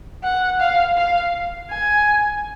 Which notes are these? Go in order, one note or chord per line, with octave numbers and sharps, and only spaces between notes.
F#5
F5
F5
G#5